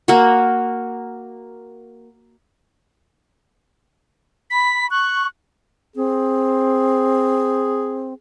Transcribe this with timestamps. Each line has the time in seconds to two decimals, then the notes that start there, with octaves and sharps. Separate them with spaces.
0.08 A#3 F#4
4.50 B5 B6
4.91 C#6 F#6
5.96 C4 G#4